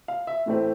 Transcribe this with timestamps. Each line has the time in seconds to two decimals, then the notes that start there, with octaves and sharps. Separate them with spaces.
0.08 F5
0.27 E5
0.46 A2 E3 A3 C4